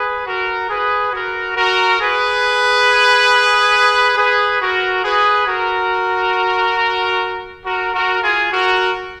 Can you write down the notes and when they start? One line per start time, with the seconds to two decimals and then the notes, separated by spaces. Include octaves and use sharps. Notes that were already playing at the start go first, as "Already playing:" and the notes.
Already playing: G#4 B4
0.26 F#4 A#4
0.70 G#4 B4
1.13 F#4 A#4
1.57 F#4 A#4
2.00 G#4 B4
4.17 G#4 B4
4.61 F#4 A#4
5.04 G#4 B4
5.47 F#4 A#4
7.65 F#4 A#4
7.94 F#4 A#4
8.23 F4 G#4
8.52 F#4 A#4